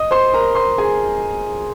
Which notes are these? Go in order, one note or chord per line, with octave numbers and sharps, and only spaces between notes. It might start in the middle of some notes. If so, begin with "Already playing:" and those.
Already playing: D#5 D#6
C5 C6
A#4 A#5
C5 C6
G#4 G#5